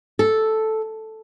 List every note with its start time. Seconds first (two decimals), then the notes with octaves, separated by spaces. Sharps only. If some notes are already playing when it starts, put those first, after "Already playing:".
0.19 A4